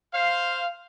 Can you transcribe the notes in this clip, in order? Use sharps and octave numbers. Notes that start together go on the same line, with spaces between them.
C5 F5